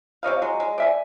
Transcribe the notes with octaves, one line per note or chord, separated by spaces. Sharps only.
C3 C#5 D#5 F5
F#3 G#3
G#3
D5 E5 G#5